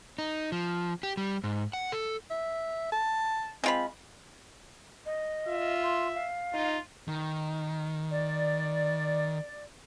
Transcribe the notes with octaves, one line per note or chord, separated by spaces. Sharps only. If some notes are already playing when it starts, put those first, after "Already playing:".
D#4
F3
G4
G3
G#2
F#5
A4
E5
A5
G#3 C4 F4 B5
D#5
F4 E5
C6
F5
D#4 F4
D#3
D5